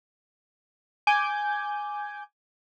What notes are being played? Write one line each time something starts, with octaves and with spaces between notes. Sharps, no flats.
G#5 D6 G6